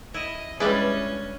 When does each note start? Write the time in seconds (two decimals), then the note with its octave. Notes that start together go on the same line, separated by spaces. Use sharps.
0.14 E4 D#5
0.60 G3 G#3 C#4 D4 E4 G#4 B4 D5